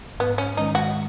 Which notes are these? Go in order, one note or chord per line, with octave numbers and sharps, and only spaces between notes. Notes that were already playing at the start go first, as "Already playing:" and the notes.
G#2 B3
C#4
D#3 G#3 C#4 D#4
F#4